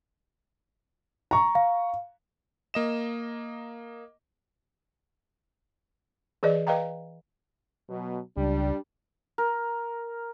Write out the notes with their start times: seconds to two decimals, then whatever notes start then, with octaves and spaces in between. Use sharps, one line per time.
1.31 A#5 C#6
1.55 F5
2.74 A#3 D#5 E7
6.43 E3 G#4 B4 D5 D#5
6.67 B4 D#5 F5 G5 A#5
7.89 B2 F#3
8.37 C#2 G3 D4
9.38 A#4